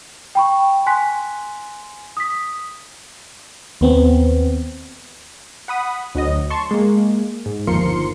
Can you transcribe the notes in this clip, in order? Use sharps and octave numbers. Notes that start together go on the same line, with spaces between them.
G5 B5 C#6
G#5 C6 F#6 B6
D#6 B6
D#2 B3 C4
F#5 B5 D#6
D2 F#3 D#5
A5 C6 C#6
G#3 A#3
G#2
G1 D#2 F3 A#4 C6 C#7